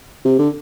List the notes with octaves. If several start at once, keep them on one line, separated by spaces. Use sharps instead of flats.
C3
D3